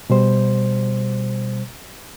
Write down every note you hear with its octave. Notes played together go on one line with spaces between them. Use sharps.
B2 G3 C5